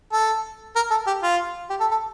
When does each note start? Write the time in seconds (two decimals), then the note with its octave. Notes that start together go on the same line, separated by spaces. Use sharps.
0.13 A4
0.76 A#4
0.91 A4
1.07 G4
1.23 F4
1.70 G4
1.80 A4
1.91 A4